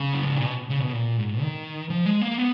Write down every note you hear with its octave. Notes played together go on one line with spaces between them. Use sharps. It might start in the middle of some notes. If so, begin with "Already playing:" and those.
Already playing: C#3
F#2
G#2
A#2
B2
C#3
B2
A#2
G#2
D#3
F3
G#3
A#3
B3